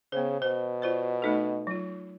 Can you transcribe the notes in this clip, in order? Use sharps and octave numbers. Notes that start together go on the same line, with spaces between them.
C#3 B3 C5
B2 C5
F4 C5 D5
A3 D#4 A4
F#3 F4